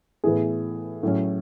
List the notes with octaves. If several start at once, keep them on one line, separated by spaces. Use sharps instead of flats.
A2 E3 B3 G#4
A2 F#3 C#4